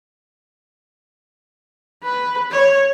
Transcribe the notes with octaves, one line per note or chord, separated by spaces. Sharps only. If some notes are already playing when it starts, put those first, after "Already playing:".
B4
C#5